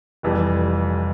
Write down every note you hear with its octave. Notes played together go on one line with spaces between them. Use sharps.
F1 F2 E3 G3